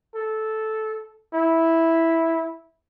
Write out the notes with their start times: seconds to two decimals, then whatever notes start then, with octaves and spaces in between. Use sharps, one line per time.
0.15 A4
1.33 E4